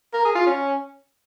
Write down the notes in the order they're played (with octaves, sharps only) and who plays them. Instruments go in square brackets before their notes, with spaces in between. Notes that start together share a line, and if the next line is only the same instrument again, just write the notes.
[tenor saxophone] A#4
G#4
F4
C#4